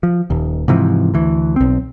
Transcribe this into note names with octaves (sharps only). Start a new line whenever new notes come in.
F3
D#1 D#2
G#2 C3 E3 F3
D2 E3
B1 C4